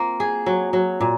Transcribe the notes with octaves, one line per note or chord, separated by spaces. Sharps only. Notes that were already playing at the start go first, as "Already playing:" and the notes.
Already playing: A#3 C4 F4
G#4
F#3
F#3
A#2